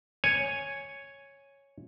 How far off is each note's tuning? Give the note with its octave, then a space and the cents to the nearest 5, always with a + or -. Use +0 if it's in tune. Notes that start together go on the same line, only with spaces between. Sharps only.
C#5 +0 G#5 +0